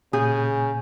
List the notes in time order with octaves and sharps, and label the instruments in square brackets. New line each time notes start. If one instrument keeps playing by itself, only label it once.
[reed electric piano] A#2 G#5 G6 [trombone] C#3 [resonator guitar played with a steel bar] G#4